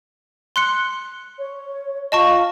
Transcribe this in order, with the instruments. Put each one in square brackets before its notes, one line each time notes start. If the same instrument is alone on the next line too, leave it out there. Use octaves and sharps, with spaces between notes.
[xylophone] C6 F#6 C#7
[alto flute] C#5
[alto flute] F4 [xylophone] D#5 A5 C#6